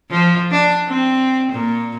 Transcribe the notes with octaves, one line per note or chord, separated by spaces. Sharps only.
F3
D4
C4
A#2